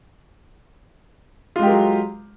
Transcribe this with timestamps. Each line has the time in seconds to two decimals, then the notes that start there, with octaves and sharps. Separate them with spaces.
1.56 F4
1.59 G#3
1.63 G4
1.67 A#4
1.70 F#3